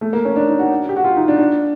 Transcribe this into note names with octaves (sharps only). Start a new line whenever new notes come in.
A3
A#3
C#4
D4
D#4
F#4
G4
F#4
F4
D#4
D4
D4